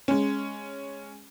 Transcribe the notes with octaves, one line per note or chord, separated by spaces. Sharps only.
G#3 C#4